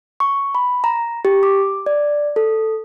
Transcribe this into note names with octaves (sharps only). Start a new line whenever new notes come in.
C#6
B5
A#5
G4
D6
D5
A4